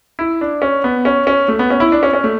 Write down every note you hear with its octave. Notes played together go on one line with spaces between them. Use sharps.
E4
D4
C#4
B3
C#4
C#4
A3
B3
C#4
E4
D4
C#4
C#4
A3